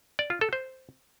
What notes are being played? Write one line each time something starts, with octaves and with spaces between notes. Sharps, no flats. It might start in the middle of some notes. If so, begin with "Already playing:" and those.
D5
F4
A4
C5